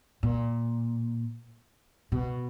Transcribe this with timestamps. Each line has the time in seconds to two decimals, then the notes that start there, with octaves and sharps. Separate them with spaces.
0.23 A#2
2.12 B2